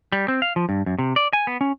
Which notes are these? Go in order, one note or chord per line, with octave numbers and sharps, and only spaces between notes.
G3
C4
F5
F3
G2
F#2
C3
D5
G#5
B3
C#4